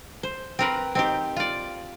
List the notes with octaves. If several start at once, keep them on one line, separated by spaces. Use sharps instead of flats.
C5
C4 A#4 B4
C4 D#4 G4
F4 D5